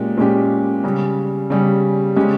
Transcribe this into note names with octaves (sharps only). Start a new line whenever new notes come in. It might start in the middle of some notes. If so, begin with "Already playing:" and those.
Already playing: A#2 G#3 C#4 G4
A#2 G#3 C#4 G4
C#3 G3 C#4
C#3 G3 C#4
C#3 G#3 C#4 G4